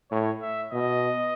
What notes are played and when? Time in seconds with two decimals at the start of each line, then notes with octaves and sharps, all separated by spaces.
0.11 A2 C#5
0.42 E5
0.72 B2 D#5